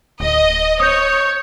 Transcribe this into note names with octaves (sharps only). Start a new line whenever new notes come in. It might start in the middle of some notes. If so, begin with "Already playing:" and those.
D1 D#5
C#5 D#6 G6